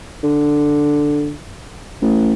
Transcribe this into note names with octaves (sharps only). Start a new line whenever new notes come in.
D3
A1